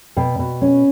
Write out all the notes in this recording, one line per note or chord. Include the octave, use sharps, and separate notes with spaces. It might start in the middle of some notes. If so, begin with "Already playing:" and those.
B2 G5
B2
C#4